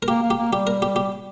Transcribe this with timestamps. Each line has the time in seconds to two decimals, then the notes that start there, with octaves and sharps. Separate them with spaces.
0.02 A#4
0.08 A#3 G4
0.23 A#3
0.30 G4
0.38 A#3
0.52 G3 G4
0.67 A#4
0.82 G4
0.96 G4